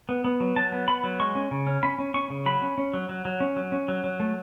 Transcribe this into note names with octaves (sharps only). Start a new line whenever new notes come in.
B3
B3
F#3
F#3 A5
B3
B3 B5
F#3
G#3 C#6
C#4
C#3
C#4
C#4 B5
C#4
C#4 C#6
C#3
F#3 B5
C#4
C#4
F#3
F#3
F#3
C#4
F#3
C#4
F#3
F#3
A3